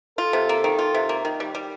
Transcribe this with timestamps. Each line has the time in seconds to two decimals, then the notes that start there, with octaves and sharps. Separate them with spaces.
0.18 F4 A4
0.33 C3
0.49 A#3
0.64 D#3
0.79 F4
0.94 C3
1.09 A#3
1.25 D#3
1.40 G3
1.55 G3